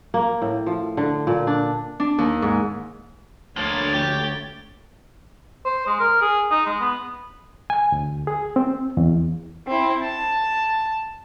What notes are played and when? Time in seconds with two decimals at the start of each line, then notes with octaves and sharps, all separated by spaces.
0.14 A#3
0.42 A2
0.66 F3
0.97 D3
1.27 A#2
1.47 D4
2.00 D4
2.18 D#2
2.42 G#2
3.57 D2 F3 A#3 C#5 A6
3.94 G4
5.66 C5
5.87 G#3
6.00 A#4
6.21 G#4
6.51 D#4
6.67 G#3
6.81 B3
7.70 G#5
7.92 D2
8.27 G#4
8.56 C4
8.97 E2
9.67 C4 E4
10.03 A5